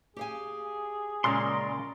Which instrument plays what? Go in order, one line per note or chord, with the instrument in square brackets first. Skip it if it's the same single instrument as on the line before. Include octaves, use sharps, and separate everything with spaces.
[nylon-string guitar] G4 F5 G#5 [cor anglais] G#4
[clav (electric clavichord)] A#2 C#3 [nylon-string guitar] G#3 C#4 [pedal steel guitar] A#4 D5 C6